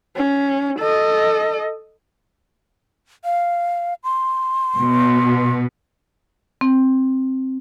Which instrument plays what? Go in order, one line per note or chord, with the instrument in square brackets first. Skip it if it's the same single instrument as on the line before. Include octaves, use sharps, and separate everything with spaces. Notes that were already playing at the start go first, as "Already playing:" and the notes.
[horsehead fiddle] C#4
A4 D#5
[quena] F5
C6
[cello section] B2
[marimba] C4